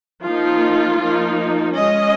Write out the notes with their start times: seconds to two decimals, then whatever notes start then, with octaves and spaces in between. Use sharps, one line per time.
0.22 F3 A#3 D#4 F4
0.99 F3 A#3 D#4
1.76 G#3 C#4 D#5